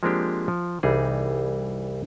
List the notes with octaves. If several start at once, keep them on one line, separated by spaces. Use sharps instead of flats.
F3 G#3 A#3 C4 D4 G4
F3
C2 E3 G3 D#4 G#4